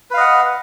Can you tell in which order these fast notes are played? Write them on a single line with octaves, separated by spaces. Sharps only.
B4 F5 D#5 F#5